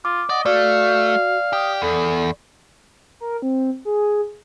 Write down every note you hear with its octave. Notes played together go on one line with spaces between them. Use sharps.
F4 D6
D5 D#5 F#5
A3 F#4 D5 F5
G4 D#6
E2 A4
A#4
C4
G#4